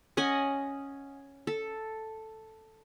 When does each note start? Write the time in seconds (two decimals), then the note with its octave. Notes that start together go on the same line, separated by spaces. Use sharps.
0.17 C#4 D#5 F#5 G#5
1.47 A4